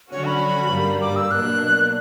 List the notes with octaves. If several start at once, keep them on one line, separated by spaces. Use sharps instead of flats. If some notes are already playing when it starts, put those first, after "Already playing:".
D3 F#3 C#4 F#4 C#5
B5
G2 D3 G3 A#3
D6
E6
B2 F#3 A#3 D4 F#6